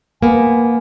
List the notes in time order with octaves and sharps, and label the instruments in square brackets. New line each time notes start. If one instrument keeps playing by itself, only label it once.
[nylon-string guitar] A#3 B3 [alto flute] G#5